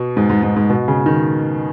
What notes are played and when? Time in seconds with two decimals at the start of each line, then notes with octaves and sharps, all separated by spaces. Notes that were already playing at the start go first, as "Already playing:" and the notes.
Already playing: B2
0.17 G#2
0.30 G#2
0.43 G#2
0.56 G#2
0.70 B2
0.88 C#3
1.06 D#3